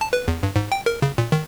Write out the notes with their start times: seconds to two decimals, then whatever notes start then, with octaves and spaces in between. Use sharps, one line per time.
0.01 A5
0.13 B4
0.28 E2
0.43 G2
0.56 G#2
0.72 G5
0.86 A#4
1.02 C#3
1.18 A#2
1.32 D#3